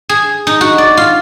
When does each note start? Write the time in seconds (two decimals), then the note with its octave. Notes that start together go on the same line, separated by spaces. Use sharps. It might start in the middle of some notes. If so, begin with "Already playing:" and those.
0.09 G#4
0.47 D#4
0.61 F#4
0.78 D5
0.97 F4